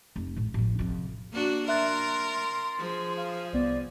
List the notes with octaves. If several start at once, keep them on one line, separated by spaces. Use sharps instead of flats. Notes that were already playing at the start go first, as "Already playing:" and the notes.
F1
A1 G#2
A1 F3
F2 C3
A#3 D4 F#4
A#4 E5 C6 F#6 A6
A6
F3 G#4
F5
C2 B3 D5